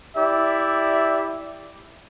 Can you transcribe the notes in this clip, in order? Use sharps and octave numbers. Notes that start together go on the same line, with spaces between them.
E4 G4 D5 E5